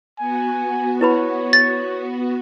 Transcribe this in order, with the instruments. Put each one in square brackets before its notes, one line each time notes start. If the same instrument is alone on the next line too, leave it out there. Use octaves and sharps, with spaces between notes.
[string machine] B3 F#4 [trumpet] G#5
[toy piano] E4 B4 B5 [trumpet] C#5
[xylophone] A6